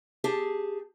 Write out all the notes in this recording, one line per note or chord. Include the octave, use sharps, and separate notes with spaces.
G4 G#4 A5